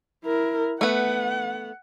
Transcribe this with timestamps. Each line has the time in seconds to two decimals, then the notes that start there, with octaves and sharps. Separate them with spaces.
0.24 E4 A#4
0.81 A3 B3 F#5